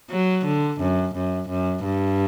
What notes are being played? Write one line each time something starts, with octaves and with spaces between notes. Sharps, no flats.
F#3
D3
F#2
F#2
F#2
G2